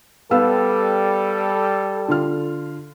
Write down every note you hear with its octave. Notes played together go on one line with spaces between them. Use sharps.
G3 B3 A4 F5 E6
D3 F4 F6